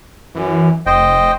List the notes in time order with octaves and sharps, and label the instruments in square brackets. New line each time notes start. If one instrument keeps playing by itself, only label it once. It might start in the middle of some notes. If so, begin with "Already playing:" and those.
[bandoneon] F#2 [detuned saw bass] E3
[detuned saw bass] F1 [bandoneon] C5 D#5 G5